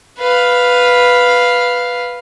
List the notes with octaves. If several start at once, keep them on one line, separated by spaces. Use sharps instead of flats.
B4 F5